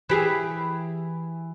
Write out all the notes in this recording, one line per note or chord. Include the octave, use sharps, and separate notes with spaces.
E3 G4 G#4